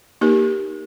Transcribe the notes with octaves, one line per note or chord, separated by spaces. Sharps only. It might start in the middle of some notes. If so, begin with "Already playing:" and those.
A#3 D#4 G4 A#4